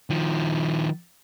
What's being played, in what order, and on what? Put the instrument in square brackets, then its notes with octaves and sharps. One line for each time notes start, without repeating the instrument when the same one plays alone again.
[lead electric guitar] D#3 F3